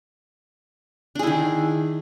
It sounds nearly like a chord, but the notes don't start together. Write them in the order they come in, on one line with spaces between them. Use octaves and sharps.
D4 G#4 E4 D#3